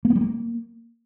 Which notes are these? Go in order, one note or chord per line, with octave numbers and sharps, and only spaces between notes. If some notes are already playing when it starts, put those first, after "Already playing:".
A#3
B3
G3
A#3